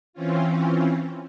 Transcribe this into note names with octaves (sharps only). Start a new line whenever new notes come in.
E3 C4 C#4 F4